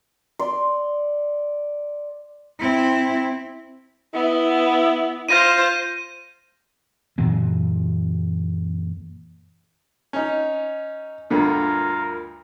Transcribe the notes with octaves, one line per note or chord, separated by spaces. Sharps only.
D5 C6
C4 E4
B3 E4
F4 C5 G6 A#6 D#7
F#2 A#2 E3 A#3
C#4 D#4
D2 G2 D3 F4 A#4